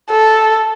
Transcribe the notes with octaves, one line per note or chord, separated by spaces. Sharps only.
A4